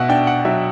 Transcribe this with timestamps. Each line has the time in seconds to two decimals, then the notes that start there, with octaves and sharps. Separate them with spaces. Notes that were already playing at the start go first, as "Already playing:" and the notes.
Already playing: B2 E5 F#5
0.09 D4 G5
0.27 F#5
0.45 F#3 E5